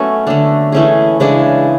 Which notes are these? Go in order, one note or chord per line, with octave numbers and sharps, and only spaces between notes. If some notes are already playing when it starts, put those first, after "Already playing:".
Already playing: F#3 A3 B3 C#4 F#4 A4
D3 A3 D4
E3 A3 C#4 G#4
C#3 E3 G#3 D4